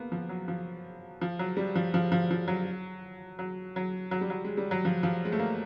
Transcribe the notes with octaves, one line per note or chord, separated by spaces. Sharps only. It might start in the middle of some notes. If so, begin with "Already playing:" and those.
Already playing: A#3 B3
F3
F#3
F3
F3
F#3
G3
F3
F3
F3
F3
F#3
F#3
F#3
F#3
G3
F#3
G#3
G3
F#3
F3
F3
G#3
A3
A#3